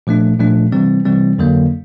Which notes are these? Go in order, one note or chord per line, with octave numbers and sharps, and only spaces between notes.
A#2 F3 A3 D4
A#2 F3 A3 D4
C3 E3 G3 C4
C3 E3 G3 C4
F2 D3 F#3 A#3